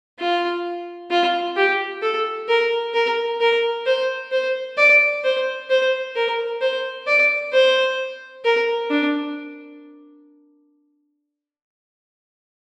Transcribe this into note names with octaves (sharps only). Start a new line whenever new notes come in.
F4
F4
G4
A4
A#4
A#4
A#4
C5
C5
D5
C5
C5
A#4
C5
D5
C5
A#4
D4